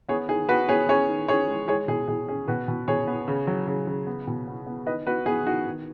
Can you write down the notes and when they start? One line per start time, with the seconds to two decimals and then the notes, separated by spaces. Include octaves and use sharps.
0.08 B3 G#4 C#5
0.29 D#3 G#4
0.49 B3 F#4 B4
0.69 B3 G#4 C#5
0.89 C#4 G#4 C#5
1.09 D#3
1.28 C#4 G#4 C#5
1.48 G#3
1.68 G#3 G#4 C#5
1.88 B2 G#4
2.08 B2 G#4
2.29 C#4 G#4
2.48 B2 F#4 B4
2.68 B2
2.88 B2 G#4 C#5
3.08 B3
3.28 C#3
3.47 F#3
3.67 C#3
3.87 C#3
4.07 B3
4.27 B2
4.48 B3
4.67 B3
4.86 D#3 B4 D#5
5.07 B3 F#4 B4
5.26 B3 G#4
5.46 D#3 F#4
5.67 D#3